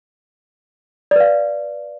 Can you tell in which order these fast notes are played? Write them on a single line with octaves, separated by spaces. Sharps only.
D5 B4 F5